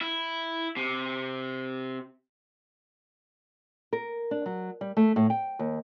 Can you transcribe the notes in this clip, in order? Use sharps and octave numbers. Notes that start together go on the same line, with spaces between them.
E4
C3
A#4
D4
F#3
G3
A3
A2
G5
D#2